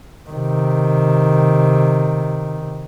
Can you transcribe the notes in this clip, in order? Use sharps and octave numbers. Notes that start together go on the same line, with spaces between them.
C3 D#3